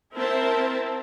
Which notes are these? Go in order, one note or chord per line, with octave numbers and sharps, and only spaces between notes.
C4 E4 A#4 C5 E5 A5